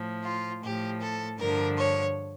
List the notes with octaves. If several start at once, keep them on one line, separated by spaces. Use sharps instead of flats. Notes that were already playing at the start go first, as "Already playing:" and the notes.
Already playing: A2 F3
F4
A2 F3 G4
A4
G2 D3 F3 A#4
C#5